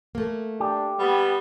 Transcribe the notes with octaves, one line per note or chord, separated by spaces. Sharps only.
A3 A#3
D4 G4
G3 B3